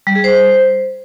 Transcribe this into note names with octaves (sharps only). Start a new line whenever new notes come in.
G3
G#4
C5